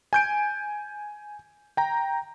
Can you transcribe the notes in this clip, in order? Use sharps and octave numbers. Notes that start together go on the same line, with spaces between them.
G#5 G6 D7
G5 A#5